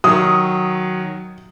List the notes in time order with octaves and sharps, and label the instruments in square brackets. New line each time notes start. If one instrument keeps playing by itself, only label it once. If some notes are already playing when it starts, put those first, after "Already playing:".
[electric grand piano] D#3 F#3 [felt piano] D#6